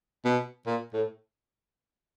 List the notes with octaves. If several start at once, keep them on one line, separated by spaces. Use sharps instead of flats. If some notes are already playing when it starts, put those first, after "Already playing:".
B2
A#2
A2